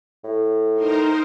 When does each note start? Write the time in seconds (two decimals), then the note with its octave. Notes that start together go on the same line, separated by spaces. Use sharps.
0.24 A2
0.74 D#4 A#4 C5